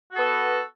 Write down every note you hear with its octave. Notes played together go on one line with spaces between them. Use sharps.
B3 F#4 A4